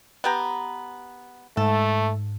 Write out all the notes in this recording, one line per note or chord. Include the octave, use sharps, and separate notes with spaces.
B3 G4 A#5
G#2 A3 A4